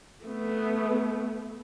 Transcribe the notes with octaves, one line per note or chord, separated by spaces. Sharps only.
A3 B3